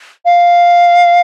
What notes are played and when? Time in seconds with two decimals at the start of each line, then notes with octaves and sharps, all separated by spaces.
0.25 F5